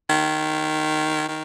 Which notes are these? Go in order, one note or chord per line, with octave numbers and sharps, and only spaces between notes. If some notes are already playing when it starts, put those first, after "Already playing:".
D#3
D#3